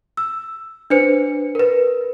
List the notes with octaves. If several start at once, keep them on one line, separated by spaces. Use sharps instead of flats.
E6
D4 B4 C5 C#7
A#4 B4